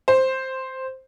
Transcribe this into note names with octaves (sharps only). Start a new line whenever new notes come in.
C5